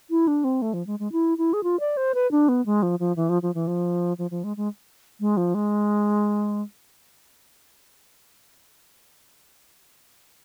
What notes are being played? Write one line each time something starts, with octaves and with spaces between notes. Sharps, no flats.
E4
D4
C4
A3
F3
G#3
G#3
E4
E4
G#4
F4
D5
C5
B4
D4
B3
G#3
F3
F3
E3
F3
F3
E3
F3
F3
F3
G#3
G#3
G#3
F3
G#3